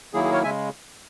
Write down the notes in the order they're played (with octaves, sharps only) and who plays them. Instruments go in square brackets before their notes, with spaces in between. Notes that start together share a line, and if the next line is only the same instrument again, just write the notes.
[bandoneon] D#3 F#3 A#3 E4 G#4
G#4
A#4 C#5
C#3 G#3 E5 G#5